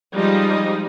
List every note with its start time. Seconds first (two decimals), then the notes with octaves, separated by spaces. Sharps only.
0.13 F3 G3 G#3 D#4 F4 D#5